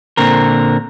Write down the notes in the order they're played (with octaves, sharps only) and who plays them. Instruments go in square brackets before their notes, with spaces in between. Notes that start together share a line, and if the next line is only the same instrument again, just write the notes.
[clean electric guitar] A#2 D3 C4 A#4